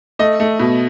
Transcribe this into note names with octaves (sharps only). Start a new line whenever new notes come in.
A3 D#5
A3
B2